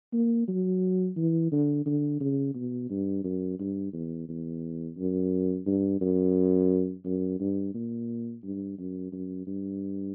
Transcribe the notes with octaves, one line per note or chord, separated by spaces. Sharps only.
A#3
F#3
E3
D3
D3
C#3
B2
G2
F#2
G2
E2
E2
F#2
G2
F#2
F#2
G2
A#2
G2
F#2
F#2
G2